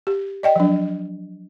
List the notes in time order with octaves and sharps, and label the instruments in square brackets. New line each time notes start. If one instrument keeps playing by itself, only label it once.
[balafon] G4
D5 D#5 G5
F3 F#3 D4